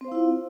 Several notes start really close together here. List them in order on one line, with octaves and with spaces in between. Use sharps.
C4 C5 F5 E4 F4